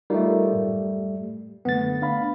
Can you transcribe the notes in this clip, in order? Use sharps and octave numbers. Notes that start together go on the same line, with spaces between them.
G3 A3 D#4 F4 A#4
F#2 A2
F#2 D3 A3 B3 A6
D4 F5 B5